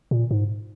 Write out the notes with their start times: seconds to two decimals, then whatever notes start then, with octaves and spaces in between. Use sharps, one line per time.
0.11 A#2
0.31 G#2